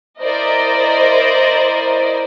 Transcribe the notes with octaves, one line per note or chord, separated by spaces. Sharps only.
E4 A#4 C5 D5 D#5